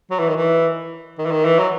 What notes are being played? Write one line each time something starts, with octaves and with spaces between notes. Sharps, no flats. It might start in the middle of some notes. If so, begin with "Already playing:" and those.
F#3
E3
D#3
E3
D#3
E3
D#3
E3
F#3